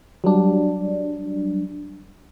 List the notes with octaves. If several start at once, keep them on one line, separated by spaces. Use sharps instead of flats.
F#3 G3 D4